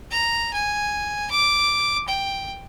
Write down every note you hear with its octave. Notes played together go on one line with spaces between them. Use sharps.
A#5
G#5
D6
G5